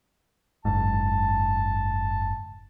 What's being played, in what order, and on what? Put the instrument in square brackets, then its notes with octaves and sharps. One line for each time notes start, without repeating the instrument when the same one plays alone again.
[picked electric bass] F#1 G#2 [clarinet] A5